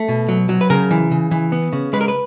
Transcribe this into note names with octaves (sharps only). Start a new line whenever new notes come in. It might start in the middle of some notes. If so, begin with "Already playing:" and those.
Already playing: A3
B2
F#3
F#3
B4
C#3 A#4
E3
C#3
E3
B3
C#3
G#3 B4
A#4
B4